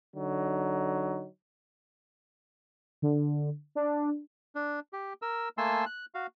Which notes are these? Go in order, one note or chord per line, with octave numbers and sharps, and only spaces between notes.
D3 F#3 D#4
D3
D4
D4
G4
A#4 E6
A3 A#3 G#5 A5 C6 E6
F#6
F#4 F5